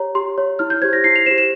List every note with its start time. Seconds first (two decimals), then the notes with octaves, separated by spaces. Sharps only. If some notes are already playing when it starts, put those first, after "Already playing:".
Already playing: G4 C#5 A#5
0.15 G4 C6
0.38 C#5
0.59 E4 F6
0.70 G6
0.82 G4 C5 G#6
0.93 A#6
1.04 E4 C7
1.16 F7
1.26 G4 C5 E7
1.38 E7